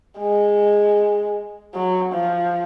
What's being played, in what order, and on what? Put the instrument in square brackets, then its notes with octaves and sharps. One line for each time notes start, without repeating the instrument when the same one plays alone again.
[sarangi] G#3
F#3
F3